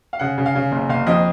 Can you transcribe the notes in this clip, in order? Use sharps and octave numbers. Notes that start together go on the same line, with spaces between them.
F5
C#3 F#5
C#3
F5
C#3
F#1
F#1 F5
F2 D#5